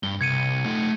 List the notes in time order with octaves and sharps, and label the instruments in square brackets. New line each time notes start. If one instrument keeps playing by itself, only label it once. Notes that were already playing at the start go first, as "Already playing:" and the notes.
[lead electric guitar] G2 [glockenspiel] G7
[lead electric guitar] C2 [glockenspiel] G#6 C#7 D#7
[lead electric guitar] A3 D#4